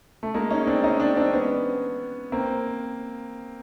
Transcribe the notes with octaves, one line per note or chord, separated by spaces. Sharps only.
A3
G#3 A#3
C#4 D#4
C4 D4
C#4 D#4
C4 D4
C4 D4
B3 C#4
A#3 C4